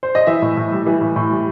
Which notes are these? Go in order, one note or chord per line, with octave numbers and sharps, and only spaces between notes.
C5
D#5
E3 E5
A2
A2
G3
E3
A2
A2
G3